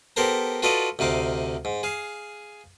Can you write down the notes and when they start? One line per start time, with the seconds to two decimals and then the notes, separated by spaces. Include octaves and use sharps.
0.16 B3 G4 A4 A#4 C5 A#5
0.62 F4 F#4 A4 B4 D5 D#5
0.99 D2 C3 D#4 F5 D6
1.65 G#2
1.83 G#4 F5